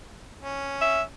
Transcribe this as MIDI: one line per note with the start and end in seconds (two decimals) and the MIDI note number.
0.42 1.04 61
0.82 1.02 76